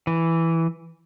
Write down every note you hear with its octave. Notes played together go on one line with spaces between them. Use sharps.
E3